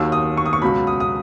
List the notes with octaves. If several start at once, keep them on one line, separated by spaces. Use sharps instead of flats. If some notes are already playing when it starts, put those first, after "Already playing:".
Already playing: D#2 D#3 F#3 E6
D#6
C#6
D#6
C#6
C#2 B2 F#3 B5
D#6
D#6